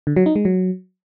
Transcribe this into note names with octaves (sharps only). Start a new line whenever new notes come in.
D3
F#3
D#4
G#3
F#3